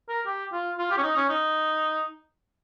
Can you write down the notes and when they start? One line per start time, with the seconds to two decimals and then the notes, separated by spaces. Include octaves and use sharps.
0.09 A#4
0.26 G4
0.52 F4
0.78 F4
0.91 G4
0.98 C#4
1.03 D#4
1.16 C#4
1.29 D#4